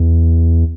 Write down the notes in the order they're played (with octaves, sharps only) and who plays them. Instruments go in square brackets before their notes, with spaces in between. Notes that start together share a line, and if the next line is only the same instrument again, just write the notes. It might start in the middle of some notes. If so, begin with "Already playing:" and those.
Already playing: [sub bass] E2